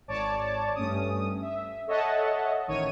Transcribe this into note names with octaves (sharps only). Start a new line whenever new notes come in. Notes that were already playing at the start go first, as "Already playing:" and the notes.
G#1 C#5 D5 A5 D6
G2 A3 C#4 D#6
E5
A4 C#5 D#5 E5 F#5 A5
A1 D#3 C#5 G#6 D#7